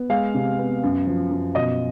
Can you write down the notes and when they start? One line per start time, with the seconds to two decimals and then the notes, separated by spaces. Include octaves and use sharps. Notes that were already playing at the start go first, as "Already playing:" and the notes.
Already playing: B3
0.10 G#3 F5
0.34 C3
0.59 B3
0.83 F#2
1.07 F3
1.31 F#2
1.55 B2 D#5